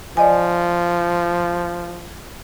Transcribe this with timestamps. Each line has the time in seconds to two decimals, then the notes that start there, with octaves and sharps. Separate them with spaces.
0.17 F3 D5 D#5 G#5